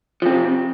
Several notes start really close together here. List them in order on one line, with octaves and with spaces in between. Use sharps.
F3 C4 C3